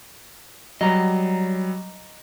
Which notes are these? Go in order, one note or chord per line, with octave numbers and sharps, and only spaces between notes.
F#3 G3 D#5 A#5